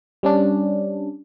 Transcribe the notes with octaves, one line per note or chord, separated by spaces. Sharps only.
G3 C#4 D4